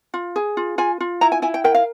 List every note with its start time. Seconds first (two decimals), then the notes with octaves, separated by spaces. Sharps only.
0.14 F4
0.36 G#4
0.57 F4
0.78 F4 G#5
1.01 F4
1.21 E4 A#5
1.32 G#5
1.42 E4 G#5
1.54 G5
1.64 A#4 G5
1.75 F5